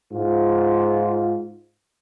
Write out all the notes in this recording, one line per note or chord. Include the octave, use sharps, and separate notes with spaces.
G#2 F4